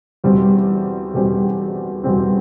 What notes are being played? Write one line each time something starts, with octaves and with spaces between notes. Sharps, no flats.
E2 B2 G3 C4
E2 B2 G3 C4
E2 B2 G3 C4